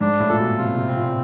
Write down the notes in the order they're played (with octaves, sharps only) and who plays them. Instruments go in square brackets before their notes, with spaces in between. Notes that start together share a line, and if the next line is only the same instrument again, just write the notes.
[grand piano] G#2 [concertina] D4
[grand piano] A2
[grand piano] A#2 [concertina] A4
[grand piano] B2
[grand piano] C3 [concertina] F4
[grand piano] C3
[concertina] C4
[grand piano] A#2